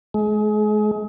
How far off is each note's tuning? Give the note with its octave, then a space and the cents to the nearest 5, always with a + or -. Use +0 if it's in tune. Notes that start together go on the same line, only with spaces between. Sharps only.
G#3 +35